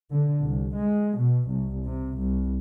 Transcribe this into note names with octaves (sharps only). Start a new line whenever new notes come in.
D3
C2
G#3
B2
C2
C3
C2